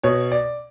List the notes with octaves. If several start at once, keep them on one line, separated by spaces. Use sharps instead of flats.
B2 C#5
D5